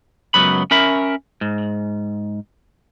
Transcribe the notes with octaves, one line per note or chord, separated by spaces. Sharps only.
C#2 F#2 F#3 B3 B5
C#4 A#4 E5 B5
G#2